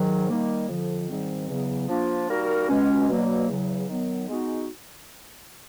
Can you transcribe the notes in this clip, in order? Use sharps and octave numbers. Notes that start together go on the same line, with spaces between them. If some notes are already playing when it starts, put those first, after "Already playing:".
Already playing: G#2 D#3 F#3
D#3 G3 A#3
F2 D3 F3
G#2 D#3 G3 C4
E2 C#3 F#3 B3
F3 A#3 D4 F4
G3 A#3 D#4 F#4 A#4
B2 G#3 C#4
B2 F#3 A#3 D4
E2 C#3 F#3
D#3 F#3 B3
G#3 B3 D#4 F#4